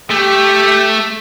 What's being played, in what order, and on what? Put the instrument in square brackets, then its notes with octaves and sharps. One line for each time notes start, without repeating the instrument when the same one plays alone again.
[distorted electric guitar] A3 [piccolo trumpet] G4